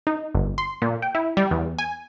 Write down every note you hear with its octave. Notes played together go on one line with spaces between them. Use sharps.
D#4
G1
C6
A#2
G5
E4
G3
E2
G#5